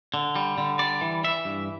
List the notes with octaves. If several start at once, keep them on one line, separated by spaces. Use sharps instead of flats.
D3
G3
D3
G3 D5
E3
E3 E5
G2